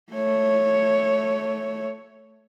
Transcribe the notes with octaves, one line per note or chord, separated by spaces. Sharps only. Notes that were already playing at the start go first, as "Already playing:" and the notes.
A3 C#5